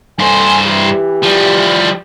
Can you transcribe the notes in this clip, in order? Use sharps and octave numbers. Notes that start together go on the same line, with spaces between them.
G2 A4 C5 G#5
E3 G4
F3 G3